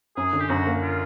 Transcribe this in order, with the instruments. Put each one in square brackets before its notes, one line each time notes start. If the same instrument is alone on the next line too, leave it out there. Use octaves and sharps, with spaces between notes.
[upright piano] F#2 [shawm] G#4
[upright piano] D3
[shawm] G4
[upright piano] F#2 [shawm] F#4
[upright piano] A#3
[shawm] F4